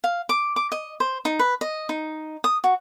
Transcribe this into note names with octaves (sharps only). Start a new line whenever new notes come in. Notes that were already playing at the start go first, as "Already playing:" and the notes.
F5
D6
D6
D#5
C5
D#4
B4
D#5
D#4
D#6
F#4